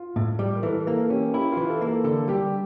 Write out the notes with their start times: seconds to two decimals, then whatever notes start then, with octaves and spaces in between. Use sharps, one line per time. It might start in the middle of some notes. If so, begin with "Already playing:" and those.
Already playing: F4
0.16 A2
0.39 G3
0.55 A#4
0.63 E3 A4
0.87 A#3 A4
1.10 C#4 G4
1.34 E4 G4
1.52 E3 F4
1.70 A4
1.81 A#3
1.87 A4
2.04 D3 A4
2.28 G3 G4